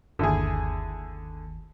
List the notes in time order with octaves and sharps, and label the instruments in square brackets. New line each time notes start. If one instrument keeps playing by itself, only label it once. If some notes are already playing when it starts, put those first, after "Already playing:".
[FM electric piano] G1 D#2 [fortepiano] D3 E4 G#4